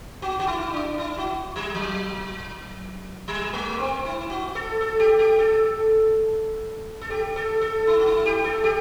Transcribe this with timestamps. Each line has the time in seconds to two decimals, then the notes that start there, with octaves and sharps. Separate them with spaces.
0.22 F#4
0.40 F#4
0.47 E4
0.73 D4
0.98 E4
1.18 F#4
1.56 G3
1.75 F#3
3.28 G3
3.53 A3
3.79 C4
4.05 E4
4.30 F#4
4.55 A4
4.81 A4
5.00 G4
5.19 G4
5.39 A4
7.01 A4
7.10 G4
7.36 A4
7.61 A4
7.87 E4
8.00 F#4
8.06 E4
8.25 G4
8.44 A4
8.64 G4